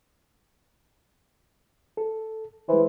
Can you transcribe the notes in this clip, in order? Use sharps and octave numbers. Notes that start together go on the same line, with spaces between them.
A4
E3 G#3 C5